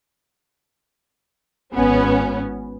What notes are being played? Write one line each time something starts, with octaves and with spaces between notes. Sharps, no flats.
G#1 B3 C#4